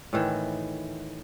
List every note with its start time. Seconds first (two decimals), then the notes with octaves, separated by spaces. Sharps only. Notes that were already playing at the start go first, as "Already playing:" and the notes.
0.13 A2 D#3 E3